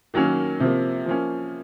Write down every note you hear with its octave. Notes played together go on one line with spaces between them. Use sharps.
D#3 F#3 A#3 C#4
C3 F3 A#3
F3 A#3 C#4